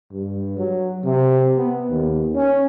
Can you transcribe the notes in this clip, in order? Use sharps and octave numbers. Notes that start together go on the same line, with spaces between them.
G2
F#3
C3
B3
D#2
C#4